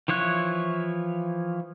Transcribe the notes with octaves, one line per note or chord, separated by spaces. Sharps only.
E3 F3 E4 C#5 F#6